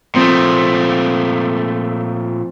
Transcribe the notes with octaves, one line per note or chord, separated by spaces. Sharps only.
A#2 F3 A3 C4 D#6